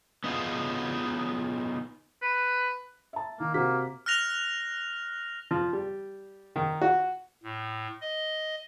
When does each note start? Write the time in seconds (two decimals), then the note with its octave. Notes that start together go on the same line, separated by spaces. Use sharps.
0.24 B3 D#4 F4 G#4
2.22 B4
3.13 E5 A5
3.40 D#3 A#3
3.54 C3 A#3 F#4 B6
4.06 F6 F#6 A#6 F7
5.51 F3
5.73 G3
6.56 D#3
6.81 F#4
7.43 A2
8.01 D#5